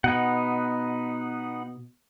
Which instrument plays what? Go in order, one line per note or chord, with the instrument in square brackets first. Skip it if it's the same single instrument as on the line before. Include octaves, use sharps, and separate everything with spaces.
[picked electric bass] B2 [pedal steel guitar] B3 D#4 F#5